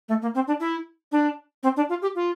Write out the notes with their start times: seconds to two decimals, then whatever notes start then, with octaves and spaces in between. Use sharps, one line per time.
0.08 A3
0.22 A#3
0.35 C4
0.47 D4
0.60 E4
1.12 D4
1.63 C4
1.76 D4
1.89 F4
2.02 G4
2.15 F4